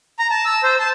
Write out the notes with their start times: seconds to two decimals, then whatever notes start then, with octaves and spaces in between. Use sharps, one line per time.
0.19 A#5
0.31 A5
0.45 E6
0.63 C5
0.79 A5